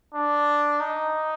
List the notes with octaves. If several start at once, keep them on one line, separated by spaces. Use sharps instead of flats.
D4
D#4